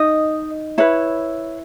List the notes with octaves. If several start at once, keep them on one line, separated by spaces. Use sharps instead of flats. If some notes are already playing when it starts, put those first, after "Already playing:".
Already playing: D#4 D#5
E4 B4 C#5